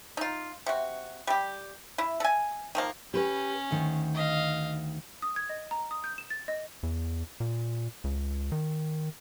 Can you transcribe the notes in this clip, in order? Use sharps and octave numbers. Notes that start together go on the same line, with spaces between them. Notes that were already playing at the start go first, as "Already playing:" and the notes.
D#4 F4
C3 F#4
G3 G4
E4
A4 G#5
D#3 F3 A#3
C#4 G4 B4
D2 D#3
D#5 F5
D#6
G#6
D#5
A#5
D#6
G6
E7
A6
D#5
E2
A#2
C#2
D#3